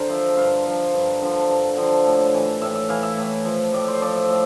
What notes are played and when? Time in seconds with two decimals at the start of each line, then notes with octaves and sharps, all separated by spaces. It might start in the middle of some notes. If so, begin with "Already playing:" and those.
Already playing: D3 A#4 C5
0.09 F3 E5
0.37 G2 F5
0.66 F3
0.94 G2
1.22 D3 F3
1.49 G2
1.77 D3 F3
2.06 A2
2.34 E3
2.61 A2 E5
2.75 E5
2.89 E3 F5
3.03 E5
3.17 A2
3.45 F3
3.73 A2 D5
3.88 C5
4.01 F3 D5
4.16 E5
4.30 A2